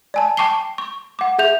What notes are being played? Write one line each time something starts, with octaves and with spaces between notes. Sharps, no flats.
D5 G#5 A5
G5 A5 C#6 D6 C7 G7
C#6
F#5 D6
G#4 E5 G6 F7